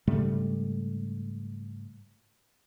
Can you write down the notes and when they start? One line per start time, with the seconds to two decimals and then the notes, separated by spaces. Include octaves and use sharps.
0.07 G#2 C#3 G3 A3